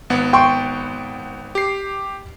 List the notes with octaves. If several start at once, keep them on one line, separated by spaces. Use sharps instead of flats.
G#1 B3 F#5
G5 C6 C#6
G4 C7